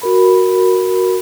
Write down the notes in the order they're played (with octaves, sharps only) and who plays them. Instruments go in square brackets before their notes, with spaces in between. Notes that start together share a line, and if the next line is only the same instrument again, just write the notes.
[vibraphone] F#4 A#4 B5